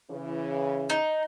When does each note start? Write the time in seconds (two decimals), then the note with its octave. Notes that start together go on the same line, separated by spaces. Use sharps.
0.10 C#3 E3
0.90 D#4